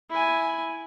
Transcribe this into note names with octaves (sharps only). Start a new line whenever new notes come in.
E4 G#5